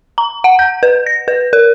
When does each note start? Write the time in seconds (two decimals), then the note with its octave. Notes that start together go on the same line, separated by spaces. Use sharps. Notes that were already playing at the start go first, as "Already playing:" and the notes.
0.18 A#5
0.44 F#5
0.59 G6
0.83 B4
1.06 A#6
1.28 B4
1.53 A#4